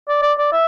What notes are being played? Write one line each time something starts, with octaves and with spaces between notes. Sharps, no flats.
D5
D5
D5
E5